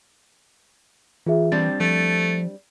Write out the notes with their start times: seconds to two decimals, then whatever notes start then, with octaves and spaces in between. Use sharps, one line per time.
1.26 E3 F4 G#4 E5
1.52 G3 C4 D4 A6
1.80 F3 A3